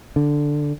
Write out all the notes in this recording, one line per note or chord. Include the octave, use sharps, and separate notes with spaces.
D3